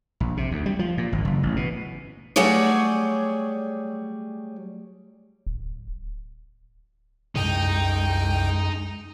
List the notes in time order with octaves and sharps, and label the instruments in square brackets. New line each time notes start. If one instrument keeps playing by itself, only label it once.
[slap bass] A#1
C3
D2
G3
F3
A#2
G#1
F#1
A1
B2
[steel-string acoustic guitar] F#3 G3 A3 G#4 C#5 D5
[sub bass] D1
[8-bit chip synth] C2 G5 [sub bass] F#2 [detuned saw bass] G#3 [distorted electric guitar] D#4